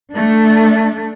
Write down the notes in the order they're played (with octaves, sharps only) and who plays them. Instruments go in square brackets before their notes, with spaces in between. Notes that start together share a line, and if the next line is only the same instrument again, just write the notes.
[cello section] A3 D4